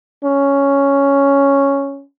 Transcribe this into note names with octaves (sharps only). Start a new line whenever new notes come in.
C#4